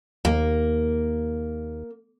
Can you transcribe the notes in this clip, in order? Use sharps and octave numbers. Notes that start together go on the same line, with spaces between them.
D#2 A#3